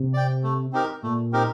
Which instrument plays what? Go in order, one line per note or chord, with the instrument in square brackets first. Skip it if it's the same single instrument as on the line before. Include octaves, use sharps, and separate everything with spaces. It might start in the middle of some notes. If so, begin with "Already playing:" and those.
Already playing: [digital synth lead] C3
[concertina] D5 G5
A3
C4 D#4 G4 A#4
[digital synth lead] A#2 [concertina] A3
[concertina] C4 D#4 G4 A#4